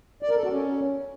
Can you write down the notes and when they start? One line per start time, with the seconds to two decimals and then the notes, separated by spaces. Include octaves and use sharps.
0.23 D5
0.30 A#4
0.37 A4
0.44 F#4
0.51 C#4